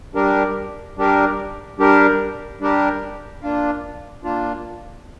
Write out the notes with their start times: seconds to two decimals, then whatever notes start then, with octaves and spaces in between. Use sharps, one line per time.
0.15 G3 D4 G4 A#4
0.97 G3 D4 G4 A#4
1.78 G3 D4 G4 A#4
2.60 G3 D4 G4 A#4
3.42 A#3 D4 F4
4.24 A#3 D4 F4